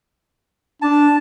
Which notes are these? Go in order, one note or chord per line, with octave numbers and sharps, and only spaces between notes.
D4 A5